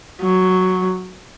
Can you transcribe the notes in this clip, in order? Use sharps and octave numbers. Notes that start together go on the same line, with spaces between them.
F#3